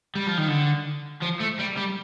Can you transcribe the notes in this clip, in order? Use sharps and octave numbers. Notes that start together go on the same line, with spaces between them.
G3
F3
D#3
D3
F3
A3
G3
G3